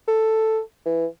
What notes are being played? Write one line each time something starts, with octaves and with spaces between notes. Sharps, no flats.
A4
E3